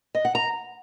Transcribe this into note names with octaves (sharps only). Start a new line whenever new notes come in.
D#5
F#5
A#5